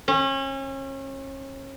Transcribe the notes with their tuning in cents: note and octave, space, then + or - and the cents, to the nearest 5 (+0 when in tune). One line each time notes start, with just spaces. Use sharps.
C#4 -35